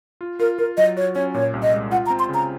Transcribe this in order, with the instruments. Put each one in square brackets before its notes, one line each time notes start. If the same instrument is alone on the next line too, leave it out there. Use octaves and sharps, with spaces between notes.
[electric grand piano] F4
[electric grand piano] F4 [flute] A#4
[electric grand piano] F4 [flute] A#4
[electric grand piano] F#3 [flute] D#5
[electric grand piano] F#4 [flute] C#5
[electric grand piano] C#4 [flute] C#5
[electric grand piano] A#2 [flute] C#5
[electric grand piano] C2
[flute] D#5
[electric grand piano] G#3
[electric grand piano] F4 [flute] F#5
[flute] A#5
[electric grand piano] C4
[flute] C6
[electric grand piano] C#3
[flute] A#5